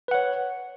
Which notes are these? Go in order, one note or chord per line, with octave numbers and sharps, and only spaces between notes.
B4 C#5 F#5